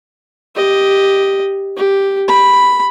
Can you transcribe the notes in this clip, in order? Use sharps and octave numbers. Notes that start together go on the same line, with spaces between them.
G4 D#5
G4
B5